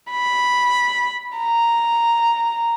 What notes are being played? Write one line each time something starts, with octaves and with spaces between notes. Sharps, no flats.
B5
A#5